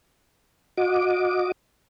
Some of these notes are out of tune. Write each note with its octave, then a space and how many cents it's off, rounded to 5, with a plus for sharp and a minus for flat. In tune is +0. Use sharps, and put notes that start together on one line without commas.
F#4 -30 D#5 +0 D6 +5